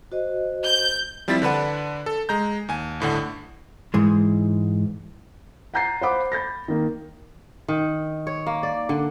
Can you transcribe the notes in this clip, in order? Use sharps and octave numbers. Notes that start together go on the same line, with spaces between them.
F#4 C5 D#5
G6
F3 G3 C4 E4 A6 B6
D3 D4 B4 F#5
A4
G#3 A#5 G6
D#2 G#5
G1 A2 D3 F#5
G#2 E3 G#3
F#5 G#5 A#5 G6 A6 C7
C5 F5 F#5 B5 D6
B5 G6 A6 A#6
D#3 A#3
D#3
C#5
A#3
D5
D3